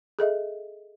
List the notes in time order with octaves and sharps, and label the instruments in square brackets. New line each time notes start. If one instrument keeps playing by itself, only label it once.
[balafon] G#4 A4 D#5 E5